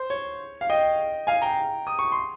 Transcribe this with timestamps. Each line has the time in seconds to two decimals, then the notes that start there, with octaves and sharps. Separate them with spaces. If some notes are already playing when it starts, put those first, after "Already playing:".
Already playing: C5
0.10 C#5
0.61 F5
0.70 D#5 G5
1.27 F5 G#5
1.42 G5 A#5
1.87 D#6
1.99 C#6
2.12 C6